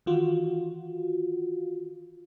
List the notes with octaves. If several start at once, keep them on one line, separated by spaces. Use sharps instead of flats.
D#3 E3 F4 F#4